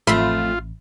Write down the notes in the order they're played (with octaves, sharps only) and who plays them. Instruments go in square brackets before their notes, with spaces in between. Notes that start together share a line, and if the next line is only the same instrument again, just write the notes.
[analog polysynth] A1 [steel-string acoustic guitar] F2 A3 [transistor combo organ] F4 [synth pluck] E5 B5 C6